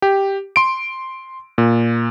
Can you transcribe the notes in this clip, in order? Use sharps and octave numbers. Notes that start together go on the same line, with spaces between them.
G4
C6 D7
A#2